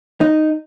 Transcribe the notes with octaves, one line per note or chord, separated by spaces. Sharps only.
D#4